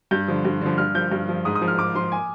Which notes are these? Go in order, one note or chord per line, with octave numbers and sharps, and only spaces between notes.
G2 G6
D3 F3
G2
D3 F3
G2 F6
F3 G6
G2
F3
G#2 D#6
D#6
F3
F6
G#2 D6
F3 C6
G#5